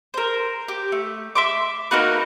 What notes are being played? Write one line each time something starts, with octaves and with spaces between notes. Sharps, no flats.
A#4 C5
G4
A3
E5 C6 D6
A#3 D#4 F#4 B4